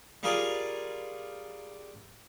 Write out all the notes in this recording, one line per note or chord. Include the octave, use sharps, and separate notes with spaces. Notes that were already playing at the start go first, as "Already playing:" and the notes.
G3 F4 G#4 A#4 D5 G#5